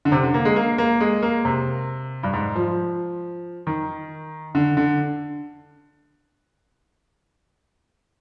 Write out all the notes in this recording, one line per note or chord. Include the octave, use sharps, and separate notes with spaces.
D3
C3
D3
A#3
G#3
A#3
A#3
G#3
A#3
C3
G2
G#2
F3
D#3
D3
D3